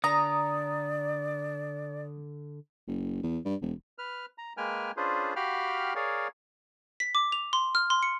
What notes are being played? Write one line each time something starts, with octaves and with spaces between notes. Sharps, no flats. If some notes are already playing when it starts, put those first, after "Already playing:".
D3 D5 A#5 D#6
F#1
E2
G2
E1
B4 F6
A#5
G#3 A#3 B4 G5 G#5 F6
C#4 D4 F4 G#4 B4 C5
F#4 G4 F5 G5 B5 F6
G#4 A#4 C#5 D5 F5
B6
D6
F7
C6
F6
C6
C#7